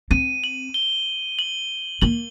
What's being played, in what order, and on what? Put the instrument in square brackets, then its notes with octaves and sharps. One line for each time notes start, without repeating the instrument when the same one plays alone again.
[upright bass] C4 [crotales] D#7
[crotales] F#7
G7
F#7
[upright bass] A#3 [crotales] F#7